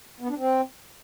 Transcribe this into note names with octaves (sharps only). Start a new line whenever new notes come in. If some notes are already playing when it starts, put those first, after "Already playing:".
B3
D4
C4